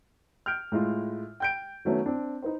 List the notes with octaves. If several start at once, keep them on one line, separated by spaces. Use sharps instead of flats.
F6 G6 D7
A2 G#3 F4
G5 G6 D7
D#3 F#3 A3 B3 C#4
C4 D4
D#4 B4 C5